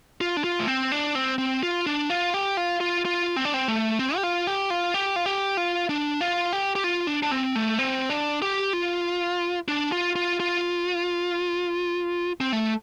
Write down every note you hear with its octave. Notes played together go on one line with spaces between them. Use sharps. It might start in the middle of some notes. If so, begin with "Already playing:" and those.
F4
D4
F4
A3
C4
D4
C4
C4
F4
D4
F4
G4
F4
F4
F4
C4
D4
C4
A3
C4
G4
F4
G4
F4
G4
F4
G4
F4
D4
F4
G4
G4
F4
D4
D4
C4
A3
C4
D4
G4
F4
D4
F4
F4
F4
C4
A3